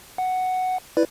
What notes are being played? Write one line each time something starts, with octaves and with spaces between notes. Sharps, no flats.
F#5
E4 B4 D5